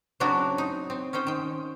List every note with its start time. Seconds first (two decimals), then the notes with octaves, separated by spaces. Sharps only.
0.20 C#3 F#3 C4 D4 E4 F#4
0.58 D#4
0.90 C4
1.13 C#4 D#4 C5 G5
1.27 D#3 G5